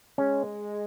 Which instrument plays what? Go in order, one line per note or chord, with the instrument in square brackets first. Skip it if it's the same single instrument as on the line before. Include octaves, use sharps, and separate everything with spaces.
[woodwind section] G#3 [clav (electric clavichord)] C#4